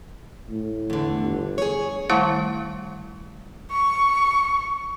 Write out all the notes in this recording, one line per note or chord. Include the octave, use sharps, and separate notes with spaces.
A2
E2 D3
G1
G#4 C#5
D#3 G3 A3 E4 F#5 A5
C#6